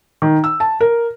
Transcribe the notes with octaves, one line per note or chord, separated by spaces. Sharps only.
D#3
E6
A5
A#4